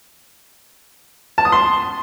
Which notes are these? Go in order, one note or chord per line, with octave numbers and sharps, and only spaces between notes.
A5
D#6
C6